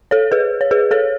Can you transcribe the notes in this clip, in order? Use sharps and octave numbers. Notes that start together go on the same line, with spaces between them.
A4 C#5
G#4 B4
C#5
G#4 B4
A4 C#5